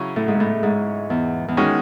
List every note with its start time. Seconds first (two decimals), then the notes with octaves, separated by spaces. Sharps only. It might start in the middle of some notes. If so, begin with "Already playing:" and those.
Already playing: C#3 F#3 C#4 E4
0.16 A2
0.28 G#2
0.40 A2
0.63 G#2
1.10 E2
1.48 E2
1.57 D#3 G#3 C#4 F#4